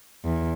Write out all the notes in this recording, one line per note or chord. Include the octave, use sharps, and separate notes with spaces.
E2